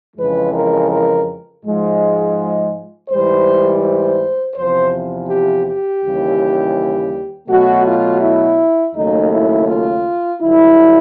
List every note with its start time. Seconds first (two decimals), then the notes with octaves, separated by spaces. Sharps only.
0.16 F2 C#3 E3 G#3 B4
0.53 A#4
0.90 A#4
1.64 G#2 F3 G#3
3.09 G#2 E3 G3 C5
3.83 C5
4.55 E2 C3 F3 C5
5.29 G4
5.66 G4
6.02 D#2 C#3 E3 G3
7.48 B2 F#3 A3 F#4
7.85 F4
8.21 E4
8.95 D#2 C#3 F#3 A3 D#4
9.32 E4
9.68 F4
10.41 G2 D3 F#3 E4